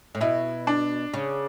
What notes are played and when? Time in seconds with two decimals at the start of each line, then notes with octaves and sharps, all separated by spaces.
0.15 A2
0.21 B2 E4
0.67 D4
1.14 C#3